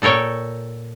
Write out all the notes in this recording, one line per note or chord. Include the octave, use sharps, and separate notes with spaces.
A#2 A4 A#4 C#5 G5